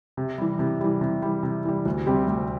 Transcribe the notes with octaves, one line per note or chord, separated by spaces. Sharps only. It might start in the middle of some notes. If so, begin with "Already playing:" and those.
C3
E3 G3
C3
E3 G3
C3
E3 G3
C3
E3 G3
D2
C3 G3 C4 G4
D2